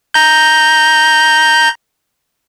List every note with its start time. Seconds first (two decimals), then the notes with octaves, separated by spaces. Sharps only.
0.14 A#5 G6